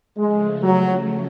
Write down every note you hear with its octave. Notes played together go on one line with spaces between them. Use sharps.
C#3 F3 G#3 A3
F#3